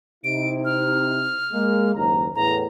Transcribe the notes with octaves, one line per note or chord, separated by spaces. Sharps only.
C3 D#4 E4 D7
F6
G#3 A#3
F#1 D#2 A#5
E2 A2 A#5